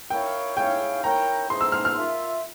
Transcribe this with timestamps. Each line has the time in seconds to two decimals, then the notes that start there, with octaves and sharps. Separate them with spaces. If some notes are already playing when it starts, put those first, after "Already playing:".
0.10 E4 A#4 C#5 F5 G5
0.57 E4 G#4 C#5 F5 G5
1.03 E4 A#4 C#5 G5 A#5
1.50 G#3 E4 G#4 C5 C6
1.61 E6
1.72 F6
1.85 F6
1.96 F4 A#4 E5